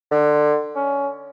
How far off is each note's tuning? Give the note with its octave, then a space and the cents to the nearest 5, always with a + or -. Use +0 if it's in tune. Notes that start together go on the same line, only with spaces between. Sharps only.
D3 +20
C#4 +20